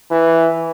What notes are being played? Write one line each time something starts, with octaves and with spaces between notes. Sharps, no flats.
E3